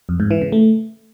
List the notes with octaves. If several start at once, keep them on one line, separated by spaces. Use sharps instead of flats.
F2
G#2
E3
C#3
A3